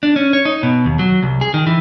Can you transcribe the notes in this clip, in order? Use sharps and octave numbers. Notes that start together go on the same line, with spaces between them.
D4
C#4
C#5
D#4
B2
D#2
F#3
C2
G#4
D#3
E3